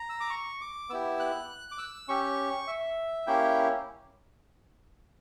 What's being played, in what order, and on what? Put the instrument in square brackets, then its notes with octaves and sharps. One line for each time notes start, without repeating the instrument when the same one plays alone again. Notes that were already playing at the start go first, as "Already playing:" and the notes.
Already playing: [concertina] A#5
E6
D6
C#6
D6
B3 E4 G4 E6
F#6
D6
E6
C#4 G4 C#6
E5
A#3 C#4 E4 G4 G5